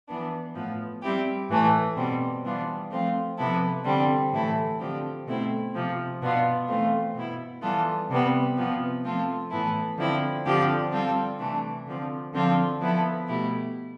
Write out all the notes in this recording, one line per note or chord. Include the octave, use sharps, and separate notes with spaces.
E3 B3 D4
A2 F3 B3
G3 C4 E4 G4
A2 E3 A3
B2 G3 C4
E3 G3 B3 D4 F4
F3 A3 C4 F4
C3 F3 B3 E4 A4
D3 G3 C4
A2 E3 A3 E4 A4
D3 F3 C4 G4
B2 A3 C4 E4
C3 F3 C4
B2 B3 D4 F4
E3 A3 C4 F4
B2 B3 E4
E3 G3 B3 F4 A4
C3 G3 B3
C3 F3 B3
F3 A3 C4 F4 A4
A2 E3 B3 E4 A4
D3 F3 C4 E4
D3 F3 C4 G4
G3 C4 F4 A4
C3 E3 A3 D4
D3 F3 C4
D3 F3 C4 F4 A4
F3 B3 E4 A4
B2 A3 E4 G4